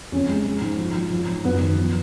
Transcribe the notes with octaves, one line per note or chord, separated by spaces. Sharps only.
F2 C#4
G#3
G#3
G#2
F3
F3
F3
G#2
F#2 B3
D#3
F3